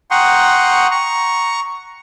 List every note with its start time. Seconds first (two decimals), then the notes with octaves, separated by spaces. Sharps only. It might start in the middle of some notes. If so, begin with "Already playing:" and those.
0.11 F#5 G5 A#5 C6 C#6 D#6
0.91 A#5 C#6